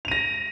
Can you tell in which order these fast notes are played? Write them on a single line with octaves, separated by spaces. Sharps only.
F7 D#7 A#6